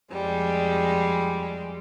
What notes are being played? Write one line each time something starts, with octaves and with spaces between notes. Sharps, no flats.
F2 G3 G#3